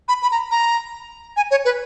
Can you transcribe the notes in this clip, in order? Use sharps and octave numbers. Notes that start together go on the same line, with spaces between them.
B5
B5
A#5
A#5
G#5
C#5
B4